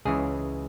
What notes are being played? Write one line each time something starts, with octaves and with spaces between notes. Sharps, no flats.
C#2 C#3 E3 G#4